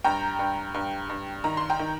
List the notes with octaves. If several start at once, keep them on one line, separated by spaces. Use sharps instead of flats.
G2 G5 A#5
G2
G2
G2
D#3 A#5
C6
G5 A#5
D#3